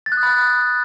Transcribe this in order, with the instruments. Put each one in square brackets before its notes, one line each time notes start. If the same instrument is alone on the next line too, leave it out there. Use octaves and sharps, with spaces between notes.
[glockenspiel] A6
F#6
D#6
B5